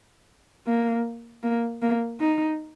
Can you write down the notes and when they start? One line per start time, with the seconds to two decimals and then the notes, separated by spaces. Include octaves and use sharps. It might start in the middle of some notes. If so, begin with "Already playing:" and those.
0.67 A#3
1.43 A#3
1.82 A#3
2.20 D#4